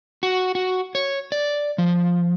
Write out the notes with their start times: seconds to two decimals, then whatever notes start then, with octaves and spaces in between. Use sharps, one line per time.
0.23 F#4
0.55 F#4
0.95 C#5
1.32 D5
1.78 F3